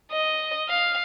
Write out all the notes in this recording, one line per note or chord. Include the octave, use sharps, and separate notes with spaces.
D#5
F5